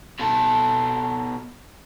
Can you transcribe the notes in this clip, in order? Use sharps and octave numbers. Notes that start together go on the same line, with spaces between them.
B2 A4